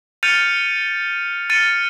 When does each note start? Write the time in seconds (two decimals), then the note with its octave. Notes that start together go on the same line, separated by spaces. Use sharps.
0.23 F6 G6 A6 C#7 D#7 F7
1.50 F6 A6 C#7 D#7